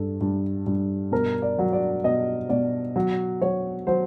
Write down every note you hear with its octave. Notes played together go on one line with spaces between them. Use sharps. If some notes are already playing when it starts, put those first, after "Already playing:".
Already playing: G2 G3 A4
G2
G2
B2 A#4
D5
F#3
D5
B2 D#5
B2 D5
F#3
F#3 C#5
F#3 C5